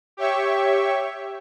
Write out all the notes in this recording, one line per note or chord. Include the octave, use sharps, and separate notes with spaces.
G4 C#5 E5 C#6